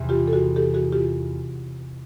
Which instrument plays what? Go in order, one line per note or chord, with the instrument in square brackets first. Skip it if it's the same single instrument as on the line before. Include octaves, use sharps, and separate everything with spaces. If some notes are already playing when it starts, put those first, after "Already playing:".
Already playing: [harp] E2 C3 E3
[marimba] F4 G4
A4
F#4 G#4
G4 A4
F#4 G#4
F4 G4